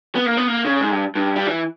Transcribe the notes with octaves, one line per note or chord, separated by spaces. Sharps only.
B3
A#3
B3
A#3
C#3
G#2
G2
G2
G3
E3